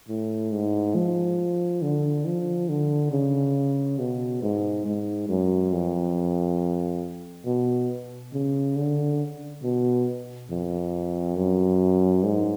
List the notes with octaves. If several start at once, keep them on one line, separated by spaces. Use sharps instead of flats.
A2
G#2
F3
D3
F3
D3
C#3
B2
G#2
G#2
F#2
F2
B2
C#3
D3
B2
F2
F#2
G#2